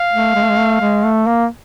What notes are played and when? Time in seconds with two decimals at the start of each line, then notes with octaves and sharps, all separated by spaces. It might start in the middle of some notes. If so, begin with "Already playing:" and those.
Already playing: F5
0.12 A3
0.35 G#3
0.43 A3
0.49 G#3
0.58 A3
0.81 G#3
1.04 A3
1.27 A#3